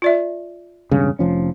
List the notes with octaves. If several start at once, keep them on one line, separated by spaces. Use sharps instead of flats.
F4 D5 E5
E1 G2 C#3
F1 F3 C#4